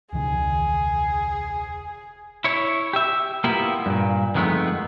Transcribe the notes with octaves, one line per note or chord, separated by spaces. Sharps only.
E1 C#2 D#3 G#4
E4 C#5
G4 E5
A#3 B3 E4 F4 G4
G2 A#2
F2 D#3 G#3 A3 B3